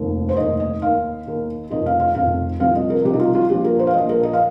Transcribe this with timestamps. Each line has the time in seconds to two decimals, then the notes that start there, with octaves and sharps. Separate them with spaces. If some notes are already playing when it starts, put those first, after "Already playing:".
Already playing: F1 D#2 D#3
0.29 C5
0.37 F1 D#2 D#3 D#5
0.60 D#5
0.82 D#2 D#3 F5
1.27 D#2 D#3
1.70 F1 F2 D#3 D#5
1.86 F5
2.00 F5
2.15 F1 F2 D#3 F5
2.60 C2 C3 F3 F5
2.75 D#5
2.90 A#4
3.04 C2 C3 F3 G4
3.14 D#4
3.19 F4
3.35 F4
3.50 A#1 A#2 F3 G4
3.64 A#4
3.79 C5
3.87 F5
3.93 A#1 A#2 F3 D#5
4.09 A#4
4.23 D#5
4.33 F5